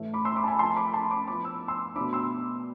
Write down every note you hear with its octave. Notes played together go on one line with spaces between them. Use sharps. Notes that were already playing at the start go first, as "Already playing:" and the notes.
Already playing: A2 E3 A3
B5 D6
C6 E6
B5 D6
A5
G#5 B5
F3 A3 C4 A5 C6
B5 D6
A5 C6
B5 D6
F3 B3 E4 B5 D6
E6
C6 E6
B2 A3 D4 B5 D6
C6 E6